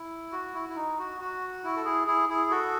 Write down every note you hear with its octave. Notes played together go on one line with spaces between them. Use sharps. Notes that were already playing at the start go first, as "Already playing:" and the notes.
Already playing: E4
F#4
E4
E4
D#4
F#4
F#4
E4
A4
E4 G#4
E4 G#4
E4 G#4
F#4 A4